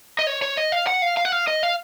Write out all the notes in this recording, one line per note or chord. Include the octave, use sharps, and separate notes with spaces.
D#5
C#5
C#5
D#5
F5
F#5
F5
F5
F#5
F5
D#5
F5